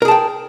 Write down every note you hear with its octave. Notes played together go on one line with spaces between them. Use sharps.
G#4 A#4 G5 A5